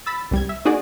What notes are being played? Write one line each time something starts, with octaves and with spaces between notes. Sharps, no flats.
B5 E6 A6
C2 G3 G#6
E5
A#3 D#4 F#4 G#4 D5